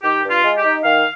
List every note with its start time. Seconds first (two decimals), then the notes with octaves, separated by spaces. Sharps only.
0.03 D#3 G4
0.24 G2
0.30 F4
0.43 G#3
0.57 G4
0.63 D#4
0.84 D#3 F5